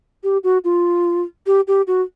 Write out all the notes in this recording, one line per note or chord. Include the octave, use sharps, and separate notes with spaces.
G4
F#4
F4
G4
G4
F#4